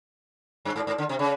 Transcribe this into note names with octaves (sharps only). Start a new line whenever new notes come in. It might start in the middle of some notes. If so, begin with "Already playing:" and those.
G2
G#2
G#2
D3
C3
C#3